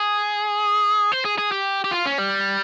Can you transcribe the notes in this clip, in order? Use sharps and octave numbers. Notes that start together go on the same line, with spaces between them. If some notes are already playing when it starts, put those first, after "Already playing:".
Already playing: G#4
C5
G#4
G#4
G4
G4
F4
C#4
G3